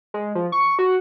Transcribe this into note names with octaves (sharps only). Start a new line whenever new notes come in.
G#3
F3
C#6
F#4